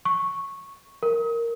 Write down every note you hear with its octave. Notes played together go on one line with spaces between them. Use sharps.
C#6
A#4